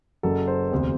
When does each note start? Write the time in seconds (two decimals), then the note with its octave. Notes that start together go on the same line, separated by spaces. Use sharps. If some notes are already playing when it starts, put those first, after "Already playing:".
0.23 F#1 F#2 F#3 A4
0.47 C5
0.71 E1 D2 C3